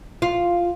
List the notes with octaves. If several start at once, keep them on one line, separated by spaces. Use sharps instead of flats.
F4